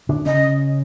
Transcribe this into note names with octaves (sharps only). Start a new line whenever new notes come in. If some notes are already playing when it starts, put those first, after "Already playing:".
D3 D4
C#3 C#4 D#5